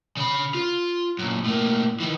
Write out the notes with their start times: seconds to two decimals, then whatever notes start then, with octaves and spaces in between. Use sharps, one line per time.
0.17 C#3 B5
0.54 F4
1.19 F#2 A#2
1.44 A2 A#3
2.00 D#3 E3